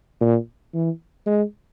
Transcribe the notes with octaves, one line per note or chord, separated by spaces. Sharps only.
A#2
E3
G#3